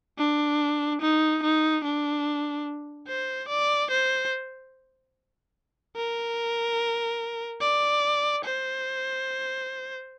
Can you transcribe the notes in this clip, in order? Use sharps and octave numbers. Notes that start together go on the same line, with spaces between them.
D4
D#4
D#4
D4
C5
D5
C5
A#4
D5
C5